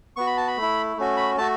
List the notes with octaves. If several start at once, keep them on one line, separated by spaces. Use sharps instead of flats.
B3 F#4 C#6
B5
A5
B5
A3
E4
A3 C#4 F#4
B5
A3 F#4 A5